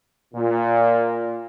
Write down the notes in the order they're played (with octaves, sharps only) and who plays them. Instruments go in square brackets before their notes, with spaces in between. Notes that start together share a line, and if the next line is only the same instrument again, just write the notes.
[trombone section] A#2